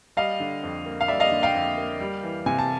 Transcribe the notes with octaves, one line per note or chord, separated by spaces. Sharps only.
G3 D#5 F5
D3
F2
A#3
F5
G3 D5 E5
D#5 F5
D3
F5 G5
F2
A#3
G3
E3
C3 G#5
A5